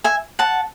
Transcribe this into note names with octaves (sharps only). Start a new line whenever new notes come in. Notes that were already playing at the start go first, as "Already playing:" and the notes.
E5 G#5
F#5 A5